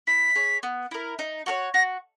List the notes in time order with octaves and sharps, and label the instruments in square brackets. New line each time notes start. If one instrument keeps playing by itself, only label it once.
[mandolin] E4 [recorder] B6
[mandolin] G#4 C#5
B3
E4 A#4
D#4
F#4 A#4 C#5
[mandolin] F#4 [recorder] A#6